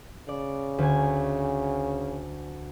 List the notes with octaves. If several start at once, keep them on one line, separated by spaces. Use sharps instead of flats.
C#3 D5
D2 G#5